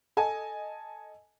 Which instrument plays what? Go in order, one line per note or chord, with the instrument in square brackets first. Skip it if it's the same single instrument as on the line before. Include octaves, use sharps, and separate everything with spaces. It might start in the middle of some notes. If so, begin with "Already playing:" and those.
[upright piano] A4 D#5 G#5 A5